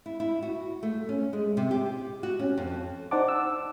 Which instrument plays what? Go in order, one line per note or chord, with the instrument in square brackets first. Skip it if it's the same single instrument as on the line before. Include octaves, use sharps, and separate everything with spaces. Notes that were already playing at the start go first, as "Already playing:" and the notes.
[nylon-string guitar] E4
E4
F#4
A3
C#4
G#3
C3
G4
F#4
C#4
F2
[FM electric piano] D#4 C5 D5 F#5 A5 D6
E6